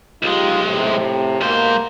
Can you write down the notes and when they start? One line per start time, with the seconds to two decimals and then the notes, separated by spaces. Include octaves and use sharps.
0.22 B1 G#3 D#4 F4 G4
0.66 A2 C3
1.41 G#2 B2 A#3 C5